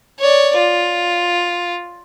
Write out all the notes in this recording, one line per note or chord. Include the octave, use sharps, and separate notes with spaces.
C#5 D5
F4